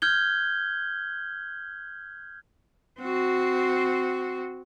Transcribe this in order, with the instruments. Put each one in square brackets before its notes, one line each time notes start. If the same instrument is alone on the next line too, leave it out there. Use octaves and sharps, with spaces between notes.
[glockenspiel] F6 G6 G#6 G7
[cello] C4 F#4